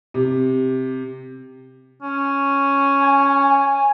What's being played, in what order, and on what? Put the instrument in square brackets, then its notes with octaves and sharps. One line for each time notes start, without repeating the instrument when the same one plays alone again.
[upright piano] C3
[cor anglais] C#4
[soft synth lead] G#5